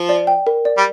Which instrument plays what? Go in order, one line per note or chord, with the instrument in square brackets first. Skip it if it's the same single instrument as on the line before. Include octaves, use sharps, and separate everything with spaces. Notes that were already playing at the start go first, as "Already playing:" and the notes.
Already playing: [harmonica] F3
[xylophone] D5
G5
A#4
D5
[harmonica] G3